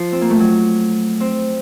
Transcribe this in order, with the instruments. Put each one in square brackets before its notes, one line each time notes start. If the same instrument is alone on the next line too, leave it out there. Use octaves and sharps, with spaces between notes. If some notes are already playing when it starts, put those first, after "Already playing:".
Already playing: [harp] F3
C4
A#3
A3
F#3
C4